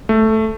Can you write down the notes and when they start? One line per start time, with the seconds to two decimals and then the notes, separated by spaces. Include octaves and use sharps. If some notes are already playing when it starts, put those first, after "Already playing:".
0.09 A3